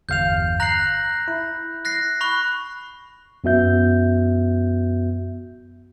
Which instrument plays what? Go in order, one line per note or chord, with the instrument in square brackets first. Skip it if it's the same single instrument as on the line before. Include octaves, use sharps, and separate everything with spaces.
[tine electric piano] G1 E2 F5 [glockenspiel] G6 F7
[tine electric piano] A#5 C7 [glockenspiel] F#6 A#6 F#7
[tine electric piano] E4
[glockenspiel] F#6 A#6 C7
B5 C#6 F#6
[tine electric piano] F#2 B3 F#4 E5 G6